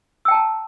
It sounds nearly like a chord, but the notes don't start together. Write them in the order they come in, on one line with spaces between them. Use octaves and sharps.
E6 G5 A5 A#5